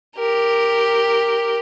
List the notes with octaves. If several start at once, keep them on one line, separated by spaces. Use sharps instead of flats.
G4 A#4